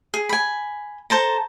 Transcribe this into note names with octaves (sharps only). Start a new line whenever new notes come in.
G#4
G#5 B5
A4 C5 A5 A#5